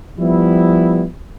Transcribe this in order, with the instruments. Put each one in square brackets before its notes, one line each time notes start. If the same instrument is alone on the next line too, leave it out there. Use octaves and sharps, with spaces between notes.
[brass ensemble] F3 G3 B3 E4